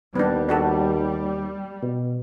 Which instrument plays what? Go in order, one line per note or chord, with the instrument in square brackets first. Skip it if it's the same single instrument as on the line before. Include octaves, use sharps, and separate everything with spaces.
[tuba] D#2 [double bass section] G3 [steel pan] B3 D4
[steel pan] D4 F#4 A4
[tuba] B2